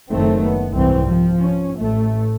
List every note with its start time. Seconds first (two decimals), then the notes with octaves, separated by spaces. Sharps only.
0.12 F#1 D#3 A3 C4
0.43 B3
0.74 C2 G#2 E3 C4
1.08 F3
1.40 C#4
1.78 A1 A3